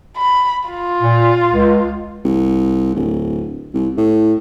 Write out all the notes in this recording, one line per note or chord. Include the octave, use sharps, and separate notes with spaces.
B5
F4
A#2
C#2
C2
D1
C2
A2